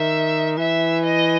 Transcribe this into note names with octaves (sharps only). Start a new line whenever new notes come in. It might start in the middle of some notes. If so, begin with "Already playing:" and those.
Already playing: D#3 E5
E3 E5
D#5